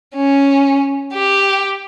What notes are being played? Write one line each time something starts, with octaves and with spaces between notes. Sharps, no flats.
C#4
G4